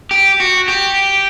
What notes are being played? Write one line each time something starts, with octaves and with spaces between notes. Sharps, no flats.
G4
F#4
G4